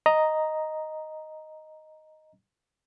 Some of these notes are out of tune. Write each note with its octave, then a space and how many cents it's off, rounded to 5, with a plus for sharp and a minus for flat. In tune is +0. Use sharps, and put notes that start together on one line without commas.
D#5 +0 A#5 +0